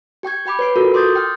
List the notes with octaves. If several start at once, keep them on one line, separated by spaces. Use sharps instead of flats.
G4 G5 C#6 G#6
G4 G5 B5 D6
B4 C#5 C7 D7
F4 F#4 A4 A#4
C6 D6 D#6 G6 A6
G5 F6